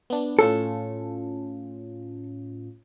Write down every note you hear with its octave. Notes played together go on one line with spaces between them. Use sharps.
B3 D4
A2 C#4 F4 A4